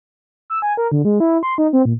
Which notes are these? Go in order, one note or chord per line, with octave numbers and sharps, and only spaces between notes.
E6
G#5
A#4
D3
G#3
E4
C6
D#4
C4
A#2